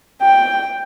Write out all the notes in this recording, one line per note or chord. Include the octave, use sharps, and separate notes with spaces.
G5